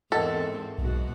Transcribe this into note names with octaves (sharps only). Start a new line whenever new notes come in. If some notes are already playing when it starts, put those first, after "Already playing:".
E2 G#2 C4 A4 A#4 D#5 F#5
B1 G#2 B2 F#4